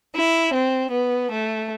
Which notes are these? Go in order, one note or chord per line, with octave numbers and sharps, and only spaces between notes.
E4
C4
B3
A3